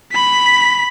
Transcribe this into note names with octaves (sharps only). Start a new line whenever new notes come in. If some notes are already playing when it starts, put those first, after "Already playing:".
B5 B6